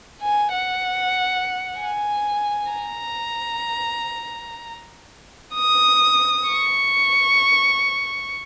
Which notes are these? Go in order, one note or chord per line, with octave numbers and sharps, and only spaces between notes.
G#5
F#5
G#5
A#5
D#6
C#6